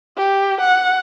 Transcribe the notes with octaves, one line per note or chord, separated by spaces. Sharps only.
G4
F#5